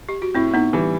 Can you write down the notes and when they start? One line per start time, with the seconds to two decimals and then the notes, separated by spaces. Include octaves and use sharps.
0.09 G4
0.22 F#4
0.35 A2 C4 E4
0.54 B3 D#4
0.73 E3 G3